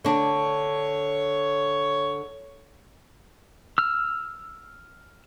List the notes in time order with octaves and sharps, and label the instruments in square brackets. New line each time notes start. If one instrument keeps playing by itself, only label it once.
[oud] D3 D4 [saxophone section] C#5
[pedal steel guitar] E6 F6